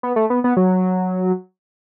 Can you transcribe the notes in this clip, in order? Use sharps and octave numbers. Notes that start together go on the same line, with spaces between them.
B3
A3
B3
B3
F#3